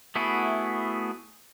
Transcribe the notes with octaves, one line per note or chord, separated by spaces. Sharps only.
A3 B3 E4 F#4 G#4